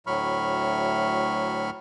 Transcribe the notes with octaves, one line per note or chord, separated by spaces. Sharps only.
D2 A2 F#3 B5 C#6 F6